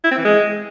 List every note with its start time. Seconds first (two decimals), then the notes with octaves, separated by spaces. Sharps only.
0.04 E4
0.11 C4
0.18 E3
0.25 G#3